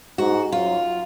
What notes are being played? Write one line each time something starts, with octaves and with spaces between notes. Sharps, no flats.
G#2 F#4
F#2 F4